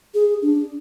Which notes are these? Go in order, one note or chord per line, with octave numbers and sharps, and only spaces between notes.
G#4
D4